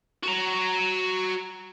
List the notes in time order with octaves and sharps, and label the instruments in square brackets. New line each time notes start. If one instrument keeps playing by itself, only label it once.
[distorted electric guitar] F#4 A#5